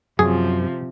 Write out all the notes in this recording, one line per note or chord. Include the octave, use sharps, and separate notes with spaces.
F#2 C3 F3 G#4